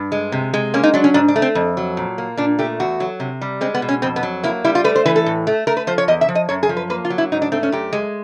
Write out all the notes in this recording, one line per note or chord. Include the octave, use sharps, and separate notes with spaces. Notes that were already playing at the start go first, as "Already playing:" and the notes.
Already playing: G2
G#3
C3
G#3
A#3 C#4
D#4
F#3 D4
C#4
G#2 D4
D4
A3
C4
F2
F#3
A#2
A#3
A#2 D4
A3 G4
E2 F#4
F#3
C3
G3
G#3 C4
B3
B2
C#4
F2 C4
B3
F#3
A#3 E4
G3 E4
F4
A3 B4
C5
E3 B4
A4
A2
A3
A3 A#4
B4
F3 C5
C#5
E2 D#5
E5
F3
D#5
F#2 C#5
G#4
F3
B4
A#3 B4
F4
F#3
E4
G#2 D#4
D4
A3 C4
C#4
F#2 G4
G#3